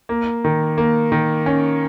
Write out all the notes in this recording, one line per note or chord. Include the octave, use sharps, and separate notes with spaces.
A#3
D#3
A#3
D#3
C#4